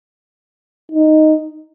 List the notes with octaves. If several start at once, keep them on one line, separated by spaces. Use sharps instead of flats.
D#4